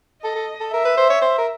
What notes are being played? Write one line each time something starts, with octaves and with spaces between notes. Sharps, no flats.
A4 D#5
A4
A4
A#4 E5
B4
C5
C#5
C5
A#4